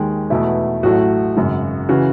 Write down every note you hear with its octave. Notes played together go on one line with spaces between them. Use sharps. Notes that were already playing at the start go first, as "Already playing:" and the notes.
Already playing: D#2 D#3 G#3
E2 B2 A3 E4
A1 A2 F#3 A3 F#4
G#1 F#2 C#3
C#3 E3 F#4